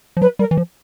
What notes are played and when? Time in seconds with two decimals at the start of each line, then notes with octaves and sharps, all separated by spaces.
0.17 F3
0.21 F#3 B4
0.39 G3 A#4
0.51 E3
0.57 F3